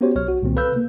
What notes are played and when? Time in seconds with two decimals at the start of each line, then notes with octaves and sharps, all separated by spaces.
0.01 B3 C#4 F#4 G4 C5 C#5
0.15 B1 C#5 F6
0.28 F#4
0.42 C2 A#2 D#3 C4
0.56 A4 B4 F5 E6 G6
0.72 C3 A#3